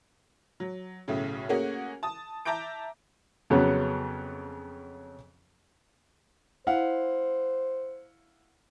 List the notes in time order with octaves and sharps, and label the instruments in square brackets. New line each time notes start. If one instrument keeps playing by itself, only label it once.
[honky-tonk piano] F#3
B1 A2 C#3
A3 A#3 C#4 F#4 G#4
A5 D#6
E5 A5 A#5 D6 G6 D7
[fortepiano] F2 C#3 F#3 B3
[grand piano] E4 F5 F#5 [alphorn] C5